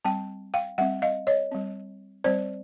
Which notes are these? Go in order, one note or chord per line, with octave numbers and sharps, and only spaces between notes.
G3 C4 G5 A5
F5 G5
G3 C4 E5 F#5
D#5 F5
C#5 D#5
G3 C4
G3 C4 C5 D5